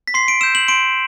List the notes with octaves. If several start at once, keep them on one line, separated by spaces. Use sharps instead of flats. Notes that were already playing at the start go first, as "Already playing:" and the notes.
B6
C6 C7
D7
E6 G6 E7
F#7
C6 D7